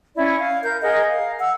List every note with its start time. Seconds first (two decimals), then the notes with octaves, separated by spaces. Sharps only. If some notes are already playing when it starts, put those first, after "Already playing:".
0.16 C#4 E4 D5
0.39 F5
0.64 A#4 G6
0.82 G#4 A#4 D#5 F#5
1.09 F5
1.39 F#5 E6